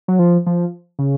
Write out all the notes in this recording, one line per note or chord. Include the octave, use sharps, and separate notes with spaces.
F#3
F3
F3
C#3